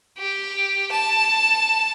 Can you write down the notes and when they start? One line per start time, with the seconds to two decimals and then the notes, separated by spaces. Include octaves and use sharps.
0.18 G4
0.91 A5